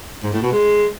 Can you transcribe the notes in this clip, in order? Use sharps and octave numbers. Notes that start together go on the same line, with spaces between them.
G#2
A2
B2
G#3